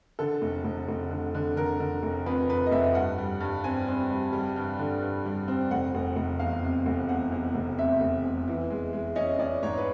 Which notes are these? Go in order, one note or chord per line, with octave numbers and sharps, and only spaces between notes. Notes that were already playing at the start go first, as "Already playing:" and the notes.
D3 A4
F1
F1
F1
D3
D3
D3 A#4
D3
F1
F2 B4
F2 B4
D#5
F1 E5
G2 F#5
G3
G2
C4 G#5
C4
G3
G3
G2
D3
G2
G3
C4
F1 F#5
F1
F1
E2 F5
C3
F1
E2 F#5
E2
F1
C3 E5
F1
E2
E3
G#3
G#3
C#4 D#5
C#4 D5
G#2 C#5
B4